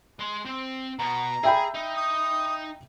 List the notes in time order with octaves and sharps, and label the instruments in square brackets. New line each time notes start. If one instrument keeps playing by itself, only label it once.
[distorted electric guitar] G#3 C6
C4
[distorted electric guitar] B2 B3 [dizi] A#5
[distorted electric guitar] G#4 [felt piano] E5 G5 B5
[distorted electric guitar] D#4
[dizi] D#6